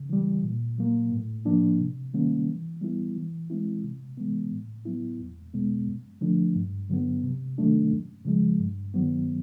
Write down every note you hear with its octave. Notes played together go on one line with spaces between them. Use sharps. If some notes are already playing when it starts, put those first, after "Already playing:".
Already playing: C#3
E3 G3
A#2
F#3 A#3
A2
F3 A#3 D4
C3
D#3 G3 A#3 C#4
E3
G3 B3 E4
E3
G#3 C4 E4
C3
E3 G#3 B3
A2
F#3 B3 E4
E2
B2 G#3 B3
F#2
D3 F3 A3 D4
G2
D3 F#3 B3
C3
D#3 F#3 A3 D4
F#2
C#3 F3 G#3
G2
D#3 F#3 B3